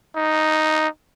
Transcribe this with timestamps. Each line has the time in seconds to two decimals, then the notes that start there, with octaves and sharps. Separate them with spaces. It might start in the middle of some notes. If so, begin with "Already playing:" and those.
0.16 D#4